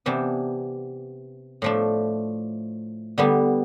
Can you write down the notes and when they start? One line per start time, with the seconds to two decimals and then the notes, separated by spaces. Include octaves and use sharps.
0.06 C3 E3 B3 D4
1.62 A2 F3 A3 D4
3.18 D3 G3 B3 D4